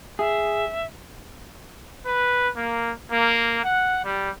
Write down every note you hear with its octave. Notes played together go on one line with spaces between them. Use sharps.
G#4 E5
B4
A#3
A#3
F#5
G3